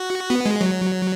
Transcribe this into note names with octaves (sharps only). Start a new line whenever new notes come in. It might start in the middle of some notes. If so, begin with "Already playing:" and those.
Already playing: F#4
B3
G#3
F#3